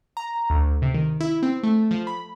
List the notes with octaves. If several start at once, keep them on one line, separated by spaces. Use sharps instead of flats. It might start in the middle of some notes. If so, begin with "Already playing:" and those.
A#5
D2
C3
D#3
E4
C4
A3
F3
B5